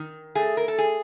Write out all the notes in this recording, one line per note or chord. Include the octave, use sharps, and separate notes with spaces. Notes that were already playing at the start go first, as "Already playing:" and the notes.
Already playing: D#3
A3 G#4
A#4
A4
G#4